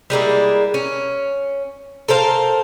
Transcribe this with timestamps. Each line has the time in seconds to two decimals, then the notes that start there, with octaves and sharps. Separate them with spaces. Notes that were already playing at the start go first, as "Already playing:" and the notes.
0.10 G3 G#3 A#3 E4
0.74 C#4
2.08 A4 A#4 C5 F5